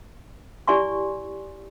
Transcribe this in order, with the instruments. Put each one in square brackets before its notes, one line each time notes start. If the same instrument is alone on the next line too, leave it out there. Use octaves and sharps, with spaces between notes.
[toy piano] E4 G4 D5 G#5 C6 C#6